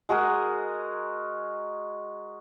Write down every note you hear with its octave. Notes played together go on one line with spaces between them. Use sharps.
G#3 F#4 G#4 A#4